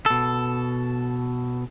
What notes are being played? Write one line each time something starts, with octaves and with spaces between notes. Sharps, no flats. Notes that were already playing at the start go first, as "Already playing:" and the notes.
B2 A4